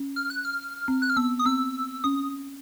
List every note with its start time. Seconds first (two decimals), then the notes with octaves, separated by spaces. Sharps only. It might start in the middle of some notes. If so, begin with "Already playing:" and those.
Already playing: C#4
0.16 F6
0.30 F#6
0.45 F6
0.88 C4
1.02 F#6
1.10 F6
1.17 B3 E6
1.39 D#6
1.46 C4 E6
2.04 C#4 D#6